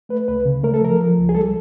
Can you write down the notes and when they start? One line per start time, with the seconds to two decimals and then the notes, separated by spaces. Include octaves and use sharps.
0.09 A3 B4
0.28 C#2 B4
0.45 C#3
0.63 A3 A#4
0.74 A4
0.82 F3 A#4
1.00 F3
1.18 C#2
1.29 G#4
1.35 G3 A4